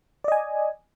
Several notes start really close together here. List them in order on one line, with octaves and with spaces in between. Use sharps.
D5 D#5 G#5